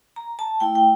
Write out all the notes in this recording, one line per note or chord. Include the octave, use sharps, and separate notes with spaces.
A#5
A5
A3 E4 G5
G5